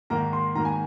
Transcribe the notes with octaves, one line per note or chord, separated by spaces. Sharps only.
G#2 D#3 A#3 A#5
C6
G#2 D#3 A#3 A#5
G#5